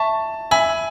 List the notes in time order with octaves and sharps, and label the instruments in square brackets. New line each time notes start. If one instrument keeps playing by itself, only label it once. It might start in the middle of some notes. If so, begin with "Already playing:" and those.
Already playing: [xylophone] E5 C#6 [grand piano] A5
[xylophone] E5 B5 E6 [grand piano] G#5